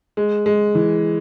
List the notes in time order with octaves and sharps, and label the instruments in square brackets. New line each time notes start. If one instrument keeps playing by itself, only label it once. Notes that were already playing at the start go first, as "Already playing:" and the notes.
[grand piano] G#3
G#3
E3